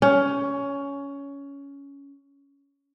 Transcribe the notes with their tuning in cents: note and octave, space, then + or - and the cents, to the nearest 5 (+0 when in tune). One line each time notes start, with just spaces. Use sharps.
C#4 +15